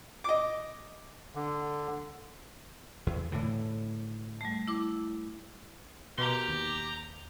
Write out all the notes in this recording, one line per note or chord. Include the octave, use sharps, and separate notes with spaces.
D#5 D6
D3
E2
A2 D3 E3
G3 A3
E4 D6
B2 B3 G4 A#4 A#5 C6
D#2